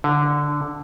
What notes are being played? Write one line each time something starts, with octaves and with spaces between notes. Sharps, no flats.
D3